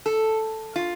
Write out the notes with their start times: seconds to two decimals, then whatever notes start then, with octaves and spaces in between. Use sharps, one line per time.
0.06 A4
0.76 F4